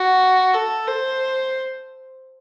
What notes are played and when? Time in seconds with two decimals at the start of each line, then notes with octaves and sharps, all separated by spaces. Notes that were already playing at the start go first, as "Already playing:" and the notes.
Already playing: F#4
0.54 A4
0.88 C5